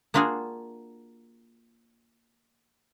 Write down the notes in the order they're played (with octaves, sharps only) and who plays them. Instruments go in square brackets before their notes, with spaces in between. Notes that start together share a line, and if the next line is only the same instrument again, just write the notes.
[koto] A#3 D4 F4 F#4 G#4